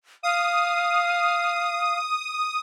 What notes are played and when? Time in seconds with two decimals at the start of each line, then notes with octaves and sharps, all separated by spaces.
0.23 F5 D#6